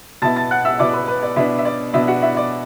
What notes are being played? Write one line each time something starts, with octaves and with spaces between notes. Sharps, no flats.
B2 B3 E4 A5 A6
A5 A6
F#5 F#6
E5 E6
B2 B3 E4 D5 D6
B4
B4
D5
B2 B3 D4 E4 E5
E5
D5
B2 B3 D4 E4 E5
F#4 F#5
E4 E5
D5